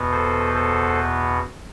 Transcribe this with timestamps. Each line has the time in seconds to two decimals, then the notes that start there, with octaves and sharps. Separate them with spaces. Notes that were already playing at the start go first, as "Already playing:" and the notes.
Already playing: E2 B2 B3
0.11 A4 C5
0.54 A4 C5